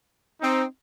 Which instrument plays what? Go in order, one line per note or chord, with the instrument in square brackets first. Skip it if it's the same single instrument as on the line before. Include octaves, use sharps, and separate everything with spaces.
[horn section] C4 D#4